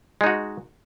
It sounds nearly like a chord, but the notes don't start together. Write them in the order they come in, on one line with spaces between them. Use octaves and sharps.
G#3 D#4 F#4